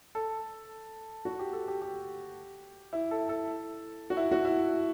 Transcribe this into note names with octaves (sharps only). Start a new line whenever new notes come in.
A4
F#4
G4
A4
G4
G4
E4
A4
A4
F#4
E4
F#4
E4